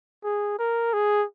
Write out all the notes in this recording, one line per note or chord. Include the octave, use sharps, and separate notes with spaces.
G#4
A#4
G#4